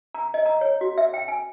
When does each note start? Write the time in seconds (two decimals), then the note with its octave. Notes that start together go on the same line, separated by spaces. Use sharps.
0.15 A#5
0.34 D#5
0.46 A#5
0.61 C#5
0.81 F#4
0.98 E5
1.14 G5
1.28 G#5